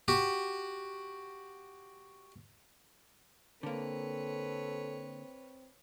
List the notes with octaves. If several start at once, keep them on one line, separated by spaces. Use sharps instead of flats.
F#4 G4
D3 A#3 C4 A4 B4 C#5